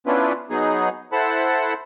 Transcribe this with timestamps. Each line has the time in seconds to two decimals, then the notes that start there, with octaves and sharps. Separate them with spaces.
0.07 B3 C#4 D4 E4 F4 B4
0.50 F#3 B3 D#4 G#4
1.12 E4 A4 C5 F#5 A5 B5